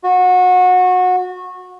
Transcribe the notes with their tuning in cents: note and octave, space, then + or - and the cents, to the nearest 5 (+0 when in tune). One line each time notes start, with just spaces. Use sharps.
F#4 -25